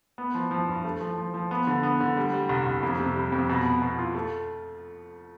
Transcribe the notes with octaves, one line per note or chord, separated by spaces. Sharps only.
B3
F3
F3
G2
A3
F3
F3
F3
B3
D3
B3
D3
G3
G3
C2
C2
F2
C3
G3
F2
B2
B3
B2
F4
A3